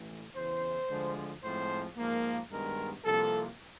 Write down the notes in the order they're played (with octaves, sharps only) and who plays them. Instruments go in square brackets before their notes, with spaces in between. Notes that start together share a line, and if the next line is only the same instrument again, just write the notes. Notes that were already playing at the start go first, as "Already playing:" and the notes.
Already playing: [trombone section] A1 E3 A3
E2 C#3 E3 C5
D2 D3 F3 G#3
A2 F3 G#3 C4 C5
G#2 F3 A#3
G2 D#3 G#3 B3 A#4
C2 C3 F3 A#3 A4